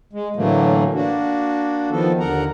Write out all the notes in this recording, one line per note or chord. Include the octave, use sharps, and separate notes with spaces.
G#3
A2 D3 E3 F#3 A3 A#3
A#3 D4 F#4
D#3 F3 B3 A4
D#2 D3 A#4 F#5 A#5